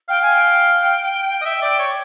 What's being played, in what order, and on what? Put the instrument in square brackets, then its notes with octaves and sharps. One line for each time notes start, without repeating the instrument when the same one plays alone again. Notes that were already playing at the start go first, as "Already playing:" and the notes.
[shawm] F5 [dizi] G5
[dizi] G#5
G5
[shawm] D#5
E5
D5
C#5